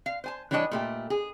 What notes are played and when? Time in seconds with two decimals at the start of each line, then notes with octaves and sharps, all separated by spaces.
0.06 F5
0.24 C5 G#5 A5
0.51 E3 G3 D4 C#5 D#5 A5
0.71 A#2 A3 G4
1.10 G#4